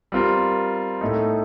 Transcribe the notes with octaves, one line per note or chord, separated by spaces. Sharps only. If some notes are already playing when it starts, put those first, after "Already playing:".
G3 C4 F4 A#4
A2 A3 D#4